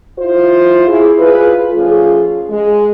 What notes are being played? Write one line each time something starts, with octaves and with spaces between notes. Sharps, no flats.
E4 F4 C5
E4 G#4
F4 G#4 B4
F3 A3 C#4 F4 G#4
G#3